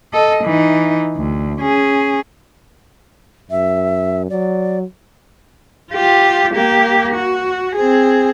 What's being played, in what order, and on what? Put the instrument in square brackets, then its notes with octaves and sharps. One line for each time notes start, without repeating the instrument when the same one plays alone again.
[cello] A4 D#5
E3 D#4
D2
C#4 G#4
[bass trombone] F#2 [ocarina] E5
[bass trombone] F#3 [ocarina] D5
[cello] F4 G4
A#3 G4
F#4
C4 G#4